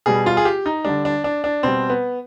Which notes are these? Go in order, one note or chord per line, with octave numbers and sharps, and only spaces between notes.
B2 G3 G#4
F4
G#4
G4
D#4
D3 G3 D4
D4
D4
D4
B2 G3 C4
B3